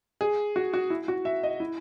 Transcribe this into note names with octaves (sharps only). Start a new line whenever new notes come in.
G#4
F#4
F#4
E4
F#4
E5
D#5
E4